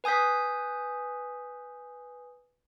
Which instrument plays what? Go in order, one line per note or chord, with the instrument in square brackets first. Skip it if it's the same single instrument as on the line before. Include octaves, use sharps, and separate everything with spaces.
[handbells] B4 G#5 D#6 G6 B6